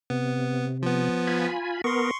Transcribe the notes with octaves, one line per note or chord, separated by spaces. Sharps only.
C3 B3
F3 B3
F4 G#5 B5
B3 A#4 C6 C#6